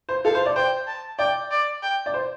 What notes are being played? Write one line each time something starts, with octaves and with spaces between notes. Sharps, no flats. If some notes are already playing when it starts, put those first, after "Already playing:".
C5
A4 F5
C5
D5
C5 G5
A5
D5 G5
D5
G5
D5
C5